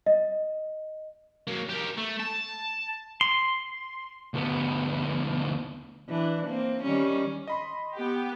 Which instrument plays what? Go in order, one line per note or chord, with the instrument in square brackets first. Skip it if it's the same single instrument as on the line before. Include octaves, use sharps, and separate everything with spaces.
[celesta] D#5
[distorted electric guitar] F#3 A#3
G4 A#4
A3
A5
[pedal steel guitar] C6
[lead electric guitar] D2 B3
[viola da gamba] E3 D4
A#3 C4
D#3 G3 C#4
[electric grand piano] D#5 B5 C6
[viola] B3 [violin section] G4